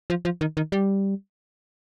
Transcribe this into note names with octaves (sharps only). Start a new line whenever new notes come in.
F3
F3
D#3
D#3
G3